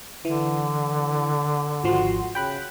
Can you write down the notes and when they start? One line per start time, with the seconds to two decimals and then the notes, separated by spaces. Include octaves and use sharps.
0.25 D3 E3
1.84 G#1 F3 F#4 C6
2.35 C#3 G5 B5 F#6